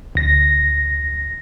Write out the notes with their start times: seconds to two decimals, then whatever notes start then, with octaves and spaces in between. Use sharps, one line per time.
0.15 D2 A#6